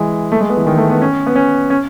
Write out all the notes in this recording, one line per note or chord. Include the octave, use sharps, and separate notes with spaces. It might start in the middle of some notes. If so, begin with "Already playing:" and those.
Already playing: E3 G#3
A3
G#3
B3
E3
D#3
A3
B3
C#4
B3
C#4
C#4